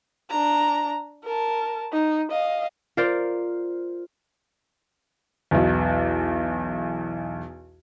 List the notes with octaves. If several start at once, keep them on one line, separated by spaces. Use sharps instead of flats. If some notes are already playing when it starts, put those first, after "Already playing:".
D4 A#5
A#4 A5
D#4
D#5 F5
F4 A#4 C5 D5
B1 E2